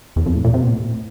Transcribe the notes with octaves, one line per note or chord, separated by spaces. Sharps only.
E2
F2
A2
A#2
C3
A#2
A2